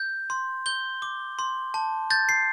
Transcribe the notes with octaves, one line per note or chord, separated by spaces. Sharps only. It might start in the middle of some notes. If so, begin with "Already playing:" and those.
Already playing: G6
C6
G6 G7
D6
C6
A5
G6 A6
C7